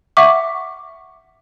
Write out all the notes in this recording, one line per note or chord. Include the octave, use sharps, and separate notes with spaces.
E5 F#5 C#6 D6